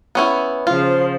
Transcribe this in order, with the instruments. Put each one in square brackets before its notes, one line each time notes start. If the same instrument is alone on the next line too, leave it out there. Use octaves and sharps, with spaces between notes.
[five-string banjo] B3 C#4 E4
[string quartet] C#3 F3 C5 [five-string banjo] F4